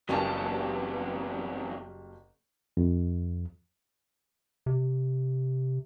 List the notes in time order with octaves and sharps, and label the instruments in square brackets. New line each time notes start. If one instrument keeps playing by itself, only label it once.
[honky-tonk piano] F#1 G3 A5 [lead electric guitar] E2 G2 [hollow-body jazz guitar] F#3 A#3 C#4
[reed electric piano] F2
[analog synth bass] C3